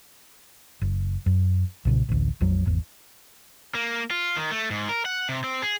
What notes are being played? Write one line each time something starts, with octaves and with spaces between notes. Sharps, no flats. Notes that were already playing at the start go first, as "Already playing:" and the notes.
F#1
F#2
B1 A#2 C#3
A1 D2
A#1 F2 F#3
G#1 E2
A#3
F4
D#3
A3
G#2
A#4
F#5
C3
C4
G#4